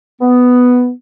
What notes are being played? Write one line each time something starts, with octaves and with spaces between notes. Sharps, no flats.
B3